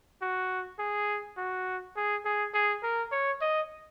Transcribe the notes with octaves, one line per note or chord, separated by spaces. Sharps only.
F#4
G#4
F#4
G#4
G#4
G#4
A#4
C#5
D#5